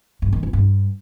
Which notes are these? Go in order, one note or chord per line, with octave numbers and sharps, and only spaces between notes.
G2
D#3
F2
G2